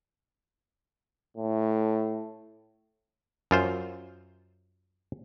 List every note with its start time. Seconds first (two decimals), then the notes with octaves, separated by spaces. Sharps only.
1.37 A2
3.51 F#2 F4 C5